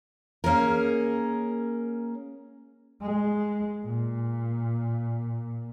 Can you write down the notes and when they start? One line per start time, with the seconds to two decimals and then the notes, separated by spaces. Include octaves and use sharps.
0.44 A#3 C#4 G#4 A#4
3.02 G#3
3.86 A#2